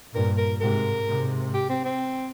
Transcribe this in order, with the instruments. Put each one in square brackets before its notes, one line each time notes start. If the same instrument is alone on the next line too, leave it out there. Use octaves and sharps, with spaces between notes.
[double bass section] G2 A#2 [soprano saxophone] A#4
[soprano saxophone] A#4
[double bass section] G#2 C3 [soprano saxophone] A#4
[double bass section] G#2 C3
[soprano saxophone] G4
C4
C4